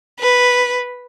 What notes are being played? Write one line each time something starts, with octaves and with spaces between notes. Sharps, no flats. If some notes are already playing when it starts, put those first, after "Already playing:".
B4